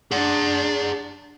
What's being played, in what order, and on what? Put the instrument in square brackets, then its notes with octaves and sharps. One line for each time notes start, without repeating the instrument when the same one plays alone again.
[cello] D4 [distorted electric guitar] G#4 F#5